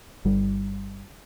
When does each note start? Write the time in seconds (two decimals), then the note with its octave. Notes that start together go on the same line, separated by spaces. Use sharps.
0.25 G1 G3